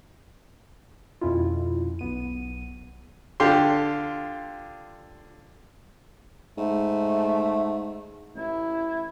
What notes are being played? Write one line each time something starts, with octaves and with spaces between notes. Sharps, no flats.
F2 B2 C#4 E4 F4
B1 B3 D#7
D3 F4 G4 C6
G#2 A3
A1 E4